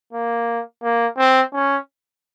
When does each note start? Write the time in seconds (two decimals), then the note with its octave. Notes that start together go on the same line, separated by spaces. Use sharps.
0.13 A#3
0.83 A#3
1.18 C4
1.53 C#4